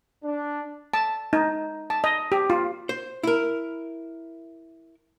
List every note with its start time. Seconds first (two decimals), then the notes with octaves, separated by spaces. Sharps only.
0.24 D4
0.94 A5
1.33 D#4
1.90 A5
2.04 D#5
2.32 G4
2.50 F4
2.89 C5
3.23 E4 A#4